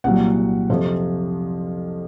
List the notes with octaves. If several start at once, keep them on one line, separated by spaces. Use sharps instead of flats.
C2 A#2 F#3 F#5
F2 C3 F3